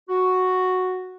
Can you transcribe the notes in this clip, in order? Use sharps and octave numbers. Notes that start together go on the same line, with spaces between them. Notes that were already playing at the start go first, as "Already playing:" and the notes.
F#4